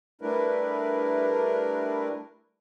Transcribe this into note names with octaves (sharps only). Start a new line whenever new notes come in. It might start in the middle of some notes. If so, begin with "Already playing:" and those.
G3 A3 D4 E4 A#4 B4